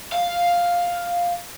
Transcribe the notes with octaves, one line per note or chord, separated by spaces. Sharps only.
F5